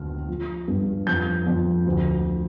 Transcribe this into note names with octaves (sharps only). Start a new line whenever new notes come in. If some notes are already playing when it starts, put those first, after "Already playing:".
Already playing: D2 D3 F6
F3
G2
F2 G6
F2
D2
F3